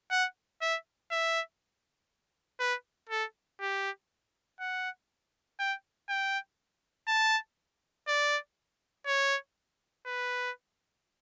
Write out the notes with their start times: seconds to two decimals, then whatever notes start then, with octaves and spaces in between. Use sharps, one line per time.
0.11 F#5
0.61 E5
1.11 E5
2.60 B4
3.09 A4
3.60 G4
4.60 F#5
5.59 G5
6.09 G5
7.07 A5
8.07 D5
9.07 C#5
10.06 B4